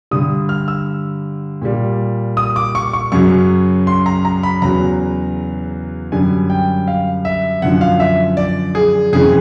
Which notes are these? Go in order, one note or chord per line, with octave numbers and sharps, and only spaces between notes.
G2 D3 G3 D#6
F6
E6
A#2 G3
D#6
D6
C#6
C#6
F#2 C#3 F#3 C#6
C6
A#5
A#5
B5
E2 C#3 F#3 A#5
F#2 D3 G3 G#5
G5
F5
E5
F#2 D3 F3 F#5
F5
E5
D5
G#4
F2 C#3 E3 G#4